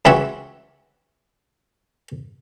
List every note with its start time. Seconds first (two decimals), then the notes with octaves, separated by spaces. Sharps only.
0.05 C#2 E3 C4 F#4 C#5 E5